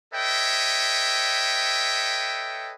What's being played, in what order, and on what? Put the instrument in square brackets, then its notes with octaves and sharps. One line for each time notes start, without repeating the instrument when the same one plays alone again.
[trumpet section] A4 B4 C#5 D#5 E5 G5